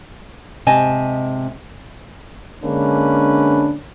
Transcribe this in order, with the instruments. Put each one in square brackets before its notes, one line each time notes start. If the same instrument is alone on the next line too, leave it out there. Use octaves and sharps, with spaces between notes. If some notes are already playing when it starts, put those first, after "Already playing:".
[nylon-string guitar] G#2 C3 D#5 G#5 A5
[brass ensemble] D3 G#3 A#3 C#4 D4 B4